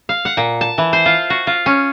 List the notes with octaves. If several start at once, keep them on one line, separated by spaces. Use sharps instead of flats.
F5
F#5
A#2
A5
E3
C5
F4
F#4
F4
C#4